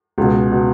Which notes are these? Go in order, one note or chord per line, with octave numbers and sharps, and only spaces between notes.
C#2 B2
B2